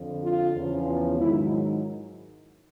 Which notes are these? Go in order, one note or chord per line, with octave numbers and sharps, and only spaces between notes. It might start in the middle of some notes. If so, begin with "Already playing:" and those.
Already playing: F2 D3 F3
F4
E2 C#3 F3
G#2 D#3 F#3 E4